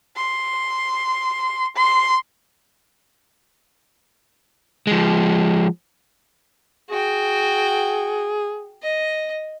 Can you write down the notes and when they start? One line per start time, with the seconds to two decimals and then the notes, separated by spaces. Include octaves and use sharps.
0.16 C6
1.76 C6
4.87 F3 G#3
6.90 F#4 G#4 G5
8.82 D#5